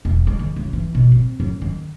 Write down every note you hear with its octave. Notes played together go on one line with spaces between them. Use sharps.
E1
G#3
D#3
C#2
E3
B2
C4
F#2
D#3